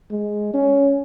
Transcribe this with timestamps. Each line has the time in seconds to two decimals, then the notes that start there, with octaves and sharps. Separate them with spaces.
0.11 G#3
0.53 C#4